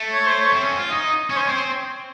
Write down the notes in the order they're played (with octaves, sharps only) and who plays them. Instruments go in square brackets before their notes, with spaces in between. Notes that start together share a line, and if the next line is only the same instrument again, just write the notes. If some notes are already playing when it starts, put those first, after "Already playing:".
Already playing: [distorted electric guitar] A3
[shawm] C#5
C5
C#5
[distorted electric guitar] C4
C#4
F#4
F4
[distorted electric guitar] D#4 [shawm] D#5
[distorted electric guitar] C#4 [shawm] C#5
[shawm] C5
C#5
[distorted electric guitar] C4
[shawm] C5